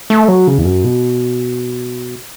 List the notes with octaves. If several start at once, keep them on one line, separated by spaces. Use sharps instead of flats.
A3
F#3
C#3
E2
F#2
B2